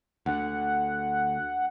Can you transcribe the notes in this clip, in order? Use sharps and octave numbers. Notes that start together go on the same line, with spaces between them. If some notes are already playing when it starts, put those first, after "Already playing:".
D2 D3 F#5